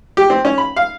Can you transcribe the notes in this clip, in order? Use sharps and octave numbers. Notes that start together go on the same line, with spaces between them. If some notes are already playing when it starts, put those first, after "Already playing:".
G4
C4
C#4
B5
F5